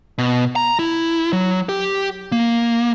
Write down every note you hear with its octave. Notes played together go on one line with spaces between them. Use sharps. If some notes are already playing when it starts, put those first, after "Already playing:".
B2
A#5
E4
F#3
G4
A#3